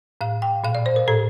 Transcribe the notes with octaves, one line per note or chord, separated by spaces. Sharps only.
A2 F5
G5
A#2 F5
D5
C5
A#4
A2 A4